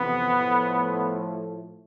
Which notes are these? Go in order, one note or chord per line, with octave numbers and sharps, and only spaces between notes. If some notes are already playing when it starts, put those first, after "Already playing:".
Already playing: F2 C3 E3 B3
A2 F3 A3